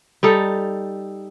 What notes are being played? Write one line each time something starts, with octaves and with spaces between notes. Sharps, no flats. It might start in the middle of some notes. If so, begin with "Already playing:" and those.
G3 D#4 A4